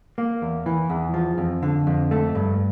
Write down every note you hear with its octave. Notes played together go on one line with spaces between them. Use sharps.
A#3
E2
E3
E2
F3
F2
D3
F2
A3
G2